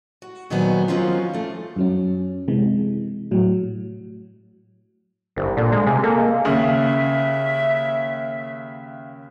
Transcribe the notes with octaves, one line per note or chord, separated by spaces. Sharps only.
F#4
A#2 D#3 F3 F#3 B3 G#5
D#3 F3 F#3 C4 C#4 F4
E3 A3
F#2 F#3 C#4
C3 E3 G#3
A2 F#3
G1 C2
A#2 D3
G#3
C3 G#4
A#3 A4
G#3
D#2 C#3 E5